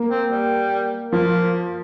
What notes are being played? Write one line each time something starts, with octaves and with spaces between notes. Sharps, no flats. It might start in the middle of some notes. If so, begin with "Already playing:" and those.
Already playing: A#3
C4
G3
F3 A#3